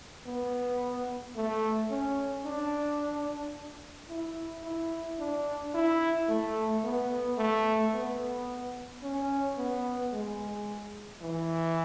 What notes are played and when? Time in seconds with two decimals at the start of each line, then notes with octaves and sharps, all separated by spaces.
0.26 B3
1.36 A3
1.90 C#4
2.45 D4
4.09 E4
4.64 E4
5.19 D4
5.74 E4
6.28 A3
6.84 B3
7.38 A3
7.93 B3
9.03 C#4
9.57 B3
10.12 G#3
11.22 E3